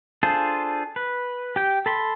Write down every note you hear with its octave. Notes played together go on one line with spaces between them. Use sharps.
D4 F4 G#4 A4 C5
B4
G4 G5
A4 B5 C6